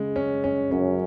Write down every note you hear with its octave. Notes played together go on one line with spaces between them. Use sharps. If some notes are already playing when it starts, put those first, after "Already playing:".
Already playing: C#3 G#3
C#4
C#4
F#2 C#4